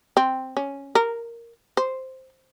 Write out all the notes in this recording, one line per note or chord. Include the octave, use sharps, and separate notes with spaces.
C4
C#4
A#4
C5